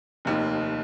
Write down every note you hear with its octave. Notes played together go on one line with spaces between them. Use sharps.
F1 D#2 D#3